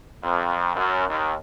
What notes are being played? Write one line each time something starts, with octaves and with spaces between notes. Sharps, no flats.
F2
F#2
D#2